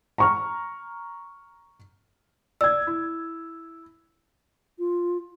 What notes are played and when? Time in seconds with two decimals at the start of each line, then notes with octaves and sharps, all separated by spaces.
0.18 A#5 C#6 F6
2.61 D5 E6 G#6
2.87 E4
4.79 F4